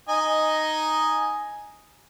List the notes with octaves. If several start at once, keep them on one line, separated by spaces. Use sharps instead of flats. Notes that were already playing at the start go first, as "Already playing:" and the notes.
D#4 D#5 G#5